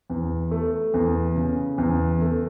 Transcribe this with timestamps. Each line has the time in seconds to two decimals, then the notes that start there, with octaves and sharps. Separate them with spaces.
0.10 E2
0.51 A3
0.94 E2
1.36 C#3
1.78 E2
2.22 A3